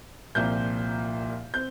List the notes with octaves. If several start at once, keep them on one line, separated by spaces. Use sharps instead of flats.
C2 A#2 F3 A#3 G6
C4 G6